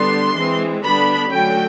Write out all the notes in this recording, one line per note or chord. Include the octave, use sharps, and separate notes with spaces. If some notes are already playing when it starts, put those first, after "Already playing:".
Already playing: D3 G3 B3 D4 C6
E3 G#3 C4
D3 G3 B3 D4 B5
D3 F#3 A3 C#4 G5